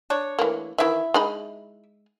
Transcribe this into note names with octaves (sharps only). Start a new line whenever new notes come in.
D4 C#5
E3 A3 A#3
D#3 E3 E4 E5
G#3 D#4 B5